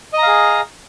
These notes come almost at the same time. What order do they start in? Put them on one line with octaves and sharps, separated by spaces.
D#5 A#5 F5 G#4